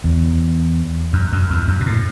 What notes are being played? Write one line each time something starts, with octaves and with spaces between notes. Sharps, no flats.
E2
F#2
F#2
E2
F#2
B2
A2